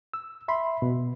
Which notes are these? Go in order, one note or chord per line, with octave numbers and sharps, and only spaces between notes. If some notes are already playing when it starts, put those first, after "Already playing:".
E6
E5 B5 C6
B2